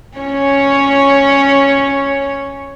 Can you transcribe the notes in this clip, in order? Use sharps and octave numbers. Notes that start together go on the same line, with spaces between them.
C#4 C#5